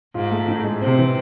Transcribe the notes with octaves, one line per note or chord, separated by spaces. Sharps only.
G#2 F4
A3
A2
G#3
C3 C4
E3